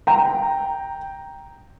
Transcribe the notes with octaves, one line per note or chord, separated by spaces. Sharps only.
G5 A#5